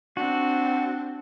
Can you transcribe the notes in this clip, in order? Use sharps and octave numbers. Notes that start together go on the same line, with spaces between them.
C4 D4 F#4